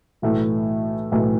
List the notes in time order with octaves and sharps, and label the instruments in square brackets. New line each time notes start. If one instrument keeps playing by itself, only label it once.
[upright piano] B1 A2 E3 A3
B1 A2 E3 A3